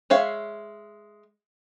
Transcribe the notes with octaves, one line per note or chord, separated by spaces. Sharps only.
G#3 C#5 E5 F5